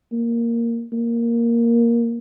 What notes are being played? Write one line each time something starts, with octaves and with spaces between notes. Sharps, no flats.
A#3
A#3